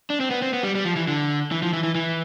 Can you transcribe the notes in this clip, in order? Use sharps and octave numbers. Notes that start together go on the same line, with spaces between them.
D4
C4
B3
C4
B3
G3
G3
F3
E3
D3
E3
F3
E3
E3
E3